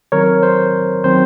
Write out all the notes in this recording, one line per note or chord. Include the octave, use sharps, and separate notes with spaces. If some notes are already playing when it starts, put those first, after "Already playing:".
D#3 F#3 C4 A#4 C#5
C5
D#3 F#3 C4 C5